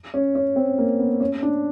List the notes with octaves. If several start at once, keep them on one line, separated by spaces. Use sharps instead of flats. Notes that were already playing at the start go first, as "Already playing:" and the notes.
C#4
C#4
C4
A#3
B3
C#4
D4